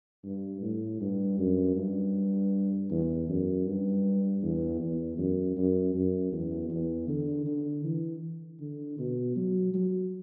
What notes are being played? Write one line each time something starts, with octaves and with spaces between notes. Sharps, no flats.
G2
A2
G2
F#2
G2
E2
F#2
G2
E2
E2
F#2
F#2
F#2
E2
E2
D3
D3
E3
D3
B2
F#3
F#3